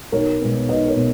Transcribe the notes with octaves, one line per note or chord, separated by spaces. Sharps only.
B1 A#4 C#5
B2 G#3 B3
B1 B4 D#5
A#4 C#5
B2